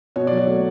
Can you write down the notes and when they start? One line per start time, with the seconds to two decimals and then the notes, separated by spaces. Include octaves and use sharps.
0.16 B2 C#5
0.27 F#3 D5
0.37 C#5
0.47 A3